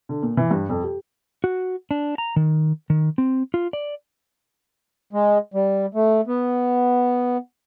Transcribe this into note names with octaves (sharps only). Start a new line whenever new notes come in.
D3
A#2
E3
G2
F2
G4
F#4
D4
A#5
D#3
D#3
C4
F4
D5
G#3
G3
A3
B3